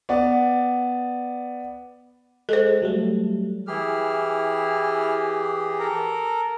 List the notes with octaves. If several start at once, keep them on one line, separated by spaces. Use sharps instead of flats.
B3 D5
G#3 A4 C5
F#3 G3 A3
E3 E4 G4 G#4 F6
A4 A#4 A#5